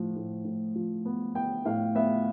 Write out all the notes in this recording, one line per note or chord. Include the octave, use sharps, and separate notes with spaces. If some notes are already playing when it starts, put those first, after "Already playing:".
Already playing: A2 F3
A2
A2
F3
B3
B3 G5
A2 F5
B3 E5